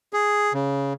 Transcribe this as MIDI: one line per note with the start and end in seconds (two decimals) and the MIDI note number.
0.13 0.53 68
0.54 0.93 49